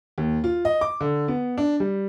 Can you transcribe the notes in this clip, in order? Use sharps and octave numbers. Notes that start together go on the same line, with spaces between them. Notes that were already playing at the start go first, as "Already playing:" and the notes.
D#2
F4
D#5
D6
D3
B3
D4
G3